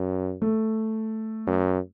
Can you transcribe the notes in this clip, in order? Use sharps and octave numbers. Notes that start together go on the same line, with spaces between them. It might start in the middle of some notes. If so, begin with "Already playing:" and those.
Already playing: F#2
A3
F#2